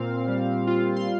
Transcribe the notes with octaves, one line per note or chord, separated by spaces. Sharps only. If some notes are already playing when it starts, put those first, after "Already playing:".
Already playing: A#2 C4 F5
G3
F4
C6